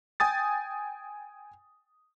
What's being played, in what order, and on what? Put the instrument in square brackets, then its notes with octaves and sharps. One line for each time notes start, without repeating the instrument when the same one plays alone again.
[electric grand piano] G5 G#5 D#6 A6